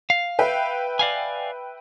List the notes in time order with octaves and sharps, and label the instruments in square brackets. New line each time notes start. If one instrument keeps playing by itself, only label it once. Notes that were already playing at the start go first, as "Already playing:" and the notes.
[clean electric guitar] F5
[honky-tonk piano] B4 E5 G5
[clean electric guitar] D5 F5 G#5